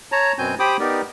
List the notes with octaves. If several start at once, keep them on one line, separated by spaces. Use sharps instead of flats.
C#5 A5 A#5
F#2 B2 C4 G#5 G6
G4 C5 G5 B5 D6 D#6
B3 D#4 G4 A#4 D5